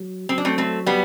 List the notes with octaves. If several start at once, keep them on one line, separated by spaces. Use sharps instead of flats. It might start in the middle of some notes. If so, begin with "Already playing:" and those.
Already playing: F#3
F#3 C4
D4
A3 C4
A3 C4
G3 B3